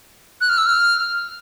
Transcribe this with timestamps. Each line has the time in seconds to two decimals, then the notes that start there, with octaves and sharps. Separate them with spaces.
0.41 F#6
0.49 F6
0.58 E6
0.66 F6